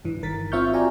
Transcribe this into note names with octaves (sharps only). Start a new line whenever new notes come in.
G2 E3
G1 D#3 A#4 A6 B6
C4 F4 E5 C#6 F6 G6
F4 F#4 D5 G5 G#5 A#5